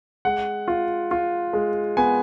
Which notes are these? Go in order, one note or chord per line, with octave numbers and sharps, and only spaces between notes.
G#3 F#5
F4
F4
G#3
B3 G#5